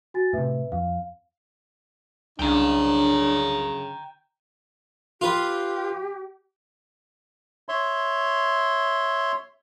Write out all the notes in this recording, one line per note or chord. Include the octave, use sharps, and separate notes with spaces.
F#4 G#5 A6
A2 C3 B4 E5
F2 F5
C2 F#2 C#3 D4 G5 A#5
F4 G4 B4
C#5 E5 C6